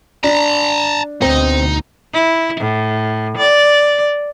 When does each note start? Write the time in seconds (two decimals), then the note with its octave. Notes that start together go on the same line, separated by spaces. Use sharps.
0.24 D4 A5 A#5
1.22 D2 B2 C4 D#4
2.14 E4
2.60 A2
3.37 D5